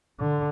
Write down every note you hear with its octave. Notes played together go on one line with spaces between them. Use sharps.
D3